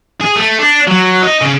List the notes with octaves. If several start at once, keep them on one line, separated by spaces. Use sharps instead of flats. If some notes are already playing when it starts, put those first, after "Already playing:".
G#4
A3
D4
F#3
D#4
C#3